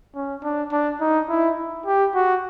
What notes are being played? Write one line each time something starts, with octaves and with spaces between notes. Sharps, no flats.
C#4
D4
D4
D#4
E4
G4
F#4